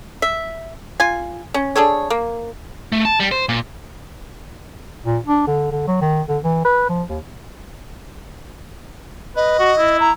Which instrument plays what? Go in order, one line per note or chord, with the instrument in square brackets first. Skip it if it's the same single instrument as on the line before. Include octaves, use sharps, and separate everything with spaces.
[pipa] E5
F4 G#5
C#4
D4 G#4 A4 C#5
A#3
[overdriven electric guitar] A3
A5
G3
C5
A#2
[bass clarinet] A#2
D4
D3
D3
F#3
D#3
D3
E3
B4
F3
D#2
[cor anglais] B4 [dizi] D#5
[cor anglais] F#4
E4
[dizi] A#5